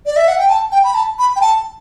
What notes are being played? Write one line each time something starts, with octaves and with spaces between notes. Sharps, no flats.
D5
E5
F#5
G5
A5
G5
B5
A5
B5
G5
A5